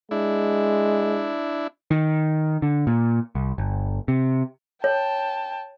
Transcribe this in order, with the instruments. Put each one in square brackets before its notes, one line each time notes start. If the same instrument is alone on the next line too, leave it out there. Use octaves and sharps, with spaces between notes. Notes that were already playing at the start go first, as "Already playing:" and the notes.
[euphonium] G#3 [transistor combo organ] D4 E4
[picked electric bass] D#3
D3
A#2
C2
G1
C3
[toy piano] C#5 [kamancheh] G5 A5